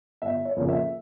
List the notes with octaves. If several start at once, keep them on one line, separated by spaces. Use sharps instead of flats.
G1 E5
C#5
F2 C#3 F3 A#3 C#5
E5